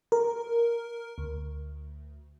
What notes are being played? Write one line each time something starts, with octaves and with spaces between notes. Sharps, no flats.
A#4
D2